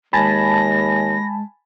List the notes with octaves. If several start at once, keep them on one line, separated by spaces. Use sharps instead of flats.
D#2 G#3 G#5 A5 B5 A#6